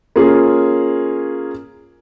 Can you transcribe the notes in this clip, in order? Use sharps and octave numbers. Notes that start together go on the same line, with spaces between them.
A#3 C#4 F4 G#4